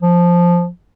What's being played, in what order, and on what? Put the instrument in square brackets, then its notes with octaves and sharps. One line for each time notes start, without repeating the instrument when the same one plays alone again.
[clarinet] F3